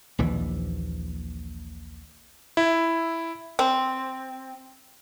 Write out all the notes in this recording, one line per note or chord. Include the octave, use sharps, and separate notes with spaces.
A#1 D#2 E3
E4
C4